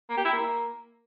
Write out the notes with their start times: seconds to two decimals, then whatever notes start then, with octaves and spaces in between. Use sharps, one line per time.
0.10 A#3
0.17 G4
0.25 E4
0.33 A#3